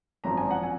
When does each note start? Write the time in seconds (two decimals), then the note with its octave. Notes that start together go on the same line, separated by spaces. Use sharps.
0.24 G#1 F#2 F3 A#5
0.37 G#5
0.51 F#5
0.63 G#5